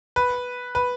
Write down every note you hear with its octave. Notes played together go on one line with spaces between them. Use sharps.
B4
B4